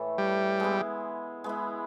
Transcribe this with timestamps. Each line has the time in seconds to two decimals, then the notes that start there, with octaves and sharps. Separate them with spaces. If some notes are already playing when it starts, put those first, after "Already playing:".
Already playing: A2 E3 A3
0.18 G3
0.60 G#3 B3 E4
1.44 G#3 B3 E4